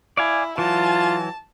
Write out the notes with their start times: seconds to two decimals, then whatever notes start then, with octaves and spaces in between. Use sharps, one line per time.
0.17 E4 D5 F5 G#5
0.58 E3 F#3 F4 A5